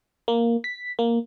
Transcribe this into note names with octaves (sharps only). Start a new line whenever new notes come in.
A#3
B6
A#3